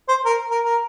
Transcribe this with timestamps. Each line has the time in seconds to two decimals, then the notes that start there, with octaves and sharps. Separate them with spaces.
0.09 C5
0.26 A#4
0.51 A#4
0.65 A#4